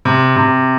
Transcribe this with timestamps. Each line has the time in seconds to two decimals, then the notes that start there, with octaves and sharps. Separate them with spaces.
0.05 C3
0.36 C3